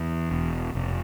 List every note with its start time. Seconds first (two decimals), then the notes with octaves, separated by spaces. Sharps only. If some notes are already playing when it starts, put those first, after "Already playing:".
Already playing: E2
0.31 E1
0.75 F1